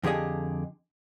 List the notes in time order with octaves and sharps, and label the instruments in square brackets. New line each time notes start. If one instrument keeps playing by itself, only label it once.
[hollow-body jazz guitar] F2 D3 G4 G#4 D#5